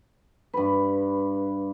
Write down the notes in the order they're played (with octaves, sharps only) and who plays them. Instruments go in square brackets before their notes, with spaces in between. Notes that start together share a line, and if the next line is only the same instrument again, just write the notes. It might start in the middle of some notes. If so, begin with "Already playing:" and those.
[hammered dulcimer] G2 B4